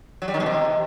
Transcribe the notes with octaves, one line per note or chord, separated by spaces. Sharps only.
F#3
G3
D#3
B2
C3